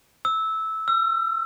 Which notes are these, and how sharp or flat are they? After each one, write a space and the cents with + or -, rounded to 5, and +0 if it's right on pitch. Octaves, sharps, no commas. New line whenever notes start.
E6 -15
E6 +40